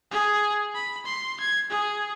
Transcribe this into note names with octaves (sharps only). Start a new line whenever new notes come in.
G#4
B5
C6
G#6
G#4